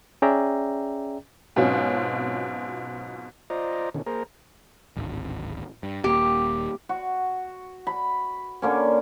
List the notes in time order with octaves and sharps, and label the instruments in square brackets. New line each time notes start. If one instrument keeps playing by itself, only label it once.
[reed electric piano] C#4 G#4 D5 E5 G5 A#5
[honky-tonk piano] G#2 B2 F#3 C4 C#4 F4
[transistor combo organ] F4 C5 D5 D#5 A#5
B2 D3 D#3 C#4
A#3 G#4 A#4 C5 A#5
[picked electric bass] D1 G#1
G2
[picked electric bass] D#1 A#3 [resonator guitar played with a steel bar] G4
[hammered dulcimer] F#4
B5
D3 A#3 C#4